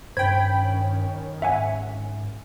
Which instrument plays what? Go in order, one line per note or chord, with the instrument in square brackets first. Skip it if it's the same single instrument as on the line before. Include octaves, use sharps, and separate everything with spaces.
[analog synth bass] G2 [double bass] D#3 C#4 [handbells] C5 G#6 [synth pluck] G5 B5
[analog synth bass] G#2 [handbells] E5 F#5 G#5